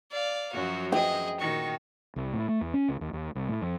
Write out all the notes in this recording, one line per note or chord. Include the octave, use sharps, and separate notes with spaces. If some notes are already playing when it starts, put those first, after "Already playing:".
D5 F5
F#2 F3 F#3 F#4
G#4 D#5 G5
A#2 D#3 F#4 C#6
C2
A2
A3
E2
C#4
C#2
D#2
D#2
C2
A2
F2